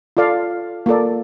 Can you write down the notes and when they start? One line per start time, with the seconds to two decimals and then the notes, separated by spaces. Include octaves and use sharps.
0.17 F4 A4 D5 F5
0.86 A#3 F4 A4 D5